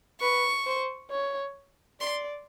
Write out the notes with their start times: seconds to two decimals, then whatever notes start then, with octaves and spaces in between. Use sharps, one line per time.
0.21 B4 C#6
0.66 C5
1.11 C#5
2.00 D5 C6